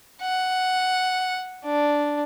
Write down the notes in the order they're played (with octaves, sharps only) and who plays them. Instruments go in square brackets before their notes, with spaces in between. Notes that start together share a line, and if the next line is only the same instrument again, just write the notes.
[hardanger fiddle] F#5
D4